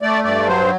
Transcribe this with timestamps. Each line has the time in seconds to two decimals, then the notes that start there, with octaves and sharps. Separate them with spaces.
0.02 A3 D5
0.24 G2 D5
0.47 F#3 C5